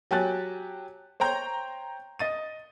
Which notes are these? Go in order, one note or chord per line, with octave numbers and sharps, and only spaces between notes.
F#3 G4 G#5 A5 F#6 A6
C5 C#5 G5 A#5 G6
D#5 A6 D#7